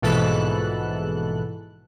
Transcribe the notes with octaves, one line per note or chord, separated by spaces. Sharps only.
A#1 G#2 B2 E3 A4 F#6